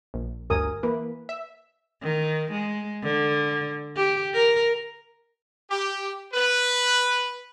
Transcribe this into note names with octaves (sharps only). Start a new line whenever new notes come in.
A#1
G1 D2 G2 A#4 G#5 D#6
E3 A#3 B4
E5
D#3
G#3
D3
G4
A#4
G4
B4